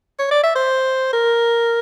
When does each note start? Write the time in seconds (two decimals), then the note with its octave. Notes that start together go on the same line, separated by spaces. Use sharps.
0.19 C#5
0.31 D5
0.44 E5
0.55 C5
1.13 A#4